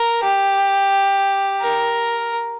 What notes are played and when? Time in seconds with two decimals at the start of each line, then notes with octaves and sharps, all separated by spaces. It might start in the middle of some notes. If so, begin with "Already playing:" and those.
Already playing: A#4
0.23 G4
1.61 A#4